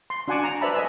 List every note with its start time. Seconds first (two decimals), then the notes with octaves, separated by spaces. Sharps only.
0.10 C6
0.28 D4 F#4 F#5 G#5 A5 D6
0.44 A#5
0.61 B4 C5 D5 E5 A5 B5
0.74 D#5 G#5 E6